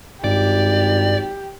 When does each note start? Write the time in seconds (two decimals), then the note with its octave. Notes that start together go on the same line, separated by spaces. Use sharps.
0.24 G#1 G2 G4 D5